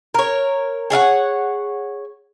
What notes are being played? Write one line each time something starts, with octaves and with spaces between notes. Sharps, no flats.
A#4 C#5
G#4 C#5 F5 F#5